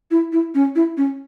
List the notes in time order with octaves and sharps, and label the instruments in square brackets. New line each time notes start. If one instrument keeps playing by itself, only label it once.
[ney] E4
E4
C#4
E4
C#4